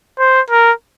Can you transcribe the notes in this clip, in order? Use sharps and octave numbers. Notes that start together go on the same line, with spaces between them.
C5
A#4